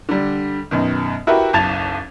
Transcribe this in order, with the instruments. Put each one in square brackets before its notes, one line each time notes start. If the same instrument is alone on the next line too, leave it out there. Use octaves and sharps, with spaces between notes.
[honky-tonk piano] D3 G3
F#2 B2 D#3
E4 F#4 G4 A#4 B4 E5
F#1 B1 A5 G#6 A6 F7